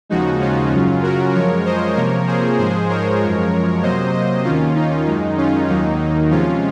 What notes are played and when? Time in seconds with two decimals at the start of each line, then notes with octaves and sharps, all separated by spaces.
0.09 D#2 C#3 F3 G#3 D#4 F#4
0.40 C#4 F4
0.72 F#2 C#3 F#3
1.03 F#4 A#4
1.34 F#2 F3 G#3 A#4 C#5
1.65 C5 D#5
1.96 C3 F3 A#3 A#4 C#5
2.27 G#4 C5
2.58 G#2 F3 G#3 G#4 C5
2.89 A#4 C#5
3.20 F#2 F3 G#3
3.82 C3 F#3 A#3 C5 D#5
4.13 C5 D#5
4.44 D#2 D#3 A#3 C#4 F4
4.75 D#4
5.07 F#2 D#3 G#3
5.37 C#4 F4
5.69 D#2 D#3 F#3 A#3 D#4
6.31 C3 F3 G#3 C#4 F4